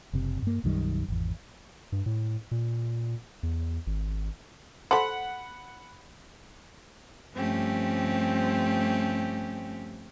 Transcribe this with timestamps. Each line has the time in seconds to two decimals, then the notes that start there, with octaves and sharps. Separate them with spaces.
0.13 F#1 C3
0.42 G2 A#3
0.64 B1 F#2 D#3 G3
1.08 G#1 E2
1.92 G2
2.06 A2
2.51 A#2
3.43 E2
3.87 G#1
4.91 A4 C5 F#5 B5
7.34 G2 F3 A3 C4 C#4 G4